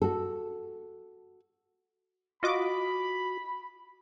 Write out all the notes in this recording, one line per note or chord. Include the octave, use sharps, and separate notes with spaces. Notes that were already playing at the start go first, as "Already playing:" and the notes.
F#4 A4
F4 F#4 D#5 B5 D6